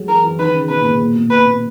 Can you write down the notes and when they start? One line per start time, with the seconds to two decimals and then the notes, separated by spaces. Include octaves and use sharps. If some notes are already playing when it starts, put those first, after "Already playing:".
Already playing: F#3 G#3
0.08 E3 A#4
0.23 E3
0.39 D#3 B4
0.54 C#3
0.69 B2 B4
0.80 A#2
0.90 G#2
1.00 A#2
1.15 B2
1.30 A#2 B4
1.46 A#2